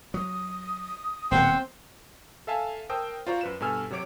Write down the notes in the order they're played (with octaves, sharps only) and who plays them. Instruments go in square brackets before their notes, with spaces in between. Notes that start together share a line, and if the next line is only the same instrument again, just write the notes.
[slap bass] F#3 [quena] D#6
[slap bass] D#1 B2 [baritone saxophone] C4 [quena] F#5
[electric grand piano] A4 E5 F5 G#5 A5
A#4 C5 G5 A5 D#6 E6
F4 F#4 C5 D5 A#5 C#6
F#2 B4 E7
G2 B2 A4 G#5 E6 F6
C3 F#3 C#5 D6 D7